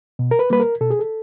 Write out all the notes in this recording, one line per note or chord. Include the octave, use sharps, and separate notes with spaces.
B2
A#4
B4
G3 A#3 B4
A#4
B2 A4
G#4
A4